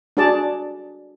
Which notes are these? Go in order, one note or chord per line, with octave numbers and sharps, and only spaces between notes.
D4 F#4 G#4 D5 A5